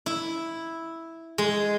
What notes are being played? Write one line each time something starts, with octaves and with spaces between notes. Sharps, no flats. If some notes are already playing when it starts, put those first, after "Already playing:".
E4
G#3